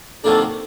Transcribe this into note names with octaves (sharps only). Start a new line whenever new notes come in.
C3 D#3 F#3 A#3 D4 A4